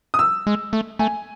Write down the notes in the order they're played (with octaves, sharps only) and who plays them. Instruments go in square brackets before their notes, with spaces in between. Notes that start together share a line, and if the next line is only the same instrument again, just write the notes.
[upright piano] D#6
E6
[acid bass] G#3
A3
[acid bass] A3 [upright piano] G#5